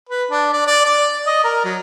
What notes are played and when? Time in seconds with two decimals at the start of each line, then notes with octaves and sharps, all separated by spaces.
0.09 B4
0.31 D4
0.53 D5
0.67 D5
0.85 D5
1.26 D#5
1.44 A#4
1.65 F#3